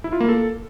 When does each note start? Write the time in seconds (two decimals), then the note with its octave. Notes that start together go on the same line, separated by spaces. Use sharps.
0.04 E4
0.12 F4
0.21 A#3
0.29 A4